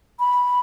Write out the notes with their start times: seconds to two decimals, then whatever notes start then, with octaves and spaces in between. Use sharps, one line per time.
0.20 B5